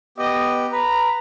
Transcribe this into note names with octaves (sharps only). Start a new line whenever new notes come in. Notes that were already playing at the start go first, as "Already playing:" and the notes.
B3 G4 D#5
B4 A#5